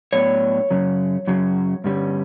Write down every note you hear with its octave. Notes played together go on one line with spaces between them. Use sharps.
A2 F#3 B3 D4 C#5
F#2 C#3 F#3
F#2 C#3 F#3
G2 D3 G3 C#4